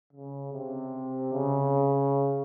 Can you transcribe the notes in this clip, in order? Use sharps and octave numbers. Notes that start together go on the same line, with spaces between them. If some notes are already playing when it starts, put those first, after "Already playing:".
C#3
C3
C#3